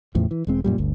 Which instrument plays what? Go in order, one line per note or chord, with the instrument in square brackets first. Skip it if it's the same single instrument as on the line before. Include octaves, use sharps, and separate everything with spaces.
[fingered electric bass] E2 A2 C#3 F3
E3
E1 G#3 C4
F#2 A#2 G3
G1 D2